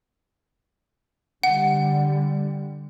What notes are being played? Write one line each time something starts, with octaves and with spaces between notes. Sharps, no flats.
D3 G3 F#5